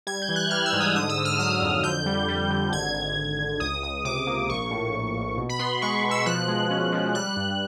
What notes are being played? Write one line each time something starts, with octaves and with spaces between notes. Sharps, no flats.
G3 G#6
G6
E3
F#6
G3 F6
E6
G#2
D#6
D3 D#6
E6
D3
F6
F#3 D#6
F2
D3 G6
G3
G3
D3
G#1 G#6
G#1
G#1
G#1
C#2 D#6
C#2 D#6
C3 D6
A#3
A#1 C#6
A2
A#1
A#1
B2
B5
B3 C6
G#3 C#6
B2
E6
F3 F#6
G#3
C#4
F3
G3 F#6
G2